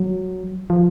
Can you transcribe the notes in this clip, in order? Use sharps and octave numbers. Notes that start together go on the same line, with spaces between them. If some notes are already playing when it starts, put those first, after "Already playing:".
Already playing: F#3
F3